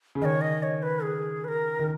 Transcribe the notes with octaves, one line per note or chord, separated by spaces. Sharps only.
C#3
D#3 C#5 D#5
D#5
C#5
B4
G#4
B4
A#4
D#3